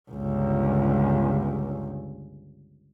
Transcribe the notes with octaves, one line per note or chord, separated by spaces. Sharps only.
G1 C#2